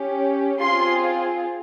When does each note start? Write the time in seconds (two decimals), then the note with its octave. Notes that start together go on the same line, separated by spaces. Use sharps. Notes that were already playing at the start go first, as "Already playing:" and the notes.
Already playing: C#4 G4
0.61 C4 F4 G#4 C6